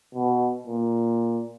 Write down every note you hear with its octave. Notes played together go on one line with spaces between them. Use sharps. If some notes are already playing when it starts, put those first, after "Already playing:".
B2
A#2